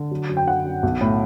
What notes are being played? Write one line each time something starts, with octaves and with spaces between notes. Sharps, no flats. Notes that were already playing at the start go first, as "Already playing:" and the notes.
Already playing: D3
F#3
F#2
G5
D3 F#5
F#2
B1
A2